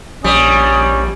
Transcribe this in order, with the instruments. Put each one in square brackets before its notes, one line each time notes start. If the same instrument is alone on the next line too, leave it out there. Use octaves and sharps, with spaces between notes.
[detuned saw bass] A#1 [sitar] G3 [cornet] C#4 [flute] D#6